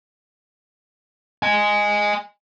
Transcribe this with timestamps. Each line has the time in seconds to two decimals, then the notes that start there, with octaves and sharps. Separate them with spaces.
1.43 D#5 G#5